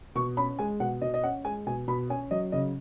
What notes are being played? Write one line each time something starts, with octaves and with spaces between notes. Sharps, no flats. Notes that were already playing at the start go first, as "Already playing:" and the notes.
B2 C#6
C#4 B5
G#3 G#5
B2 F#5
B2 D#5
D#5
C#4 F#5
G#3 G#5
B2 G#5
B2 B5
C#4 G#5
F#3 D#5
C#3 D#5